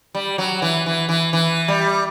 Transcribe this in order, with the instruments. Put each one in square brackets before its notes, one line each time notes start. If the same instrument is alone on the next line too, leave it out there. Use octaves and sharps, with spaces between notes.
[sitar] G3
F#3
E3
E3
E3
E3
G3